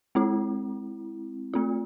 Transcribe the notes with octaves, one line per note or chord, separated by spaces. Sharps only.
G#3 C4 E4
A3 C4 F4